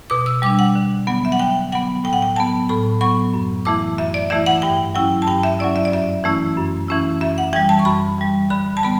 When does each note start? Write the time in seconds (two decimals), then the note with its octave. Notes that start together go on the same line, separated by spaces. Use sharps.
0.10 B2 D6
0.26 E6
0.42 G3 D4 D6
0.59 F#5
0.75 D3
1.07 F#3 B3
1.25 E5
1.32 F#5
1.39 D3 G5
1.72 F#3 B3 F#5
2.04 A2 G5
2.13 F#5
2.22 G5
2.36 F#3 B3 A5
2.69 A2 B5
3.01 F#3 B3 C#6
3.34 F#2
3.65 E3 A3 E4 D6
3.98 F#2 E5
4.14 D5
4.30 E3 A3 E4 E5
4.46 F#5
4.62 G2 G5
4.95 F#3 C#4 E4 G5
5.22 A5
5.27 G2 G5
5.43 E5
5.59 F#3 C#4 E4 D5
5.76 E5
5.85 D5
5.92 F#2 E5
6.24 E3 A3 C#4 E4
6.57 F#2
6.88 E3 A3 C#4 E4
7.21 F#2 E5
7.38 F#5
7.53 E3 G3 G5
7.69 A5
7.79 C#6
7.85 F#2 B5
8.18 E3 G3
8.50 D3 B5
8.77 A5
8.83 G3 B3 B5